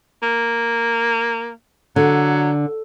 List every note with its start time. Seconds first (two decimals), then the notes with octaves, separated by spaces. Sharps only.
0.22 A#3
1.96 D3 F#3